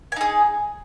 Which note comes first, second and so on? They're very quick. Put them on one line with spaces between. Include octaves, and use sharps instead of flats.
G#5 D#4 G#4